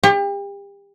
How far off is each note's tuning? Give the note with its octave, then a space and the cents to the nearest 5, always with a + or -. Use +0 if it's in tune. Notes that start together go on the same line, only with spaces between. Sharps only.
G4 +35